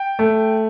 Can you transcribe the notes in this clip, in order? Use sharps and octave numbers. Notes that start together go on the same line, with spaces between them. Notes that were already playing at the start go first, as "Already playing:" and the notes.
Already playing: G5
A3